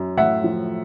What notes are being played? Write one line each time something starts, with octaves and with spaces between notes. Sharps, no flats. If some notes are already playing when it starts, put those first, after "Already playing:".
Already playing: F#2
A2 E5 F#5
F3